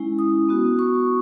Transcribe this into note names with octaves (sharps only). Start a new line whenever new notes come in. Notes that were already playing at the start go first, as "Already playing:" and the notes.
Already playing: G#3 C#4 E4
D#6
B3 F#4
C#6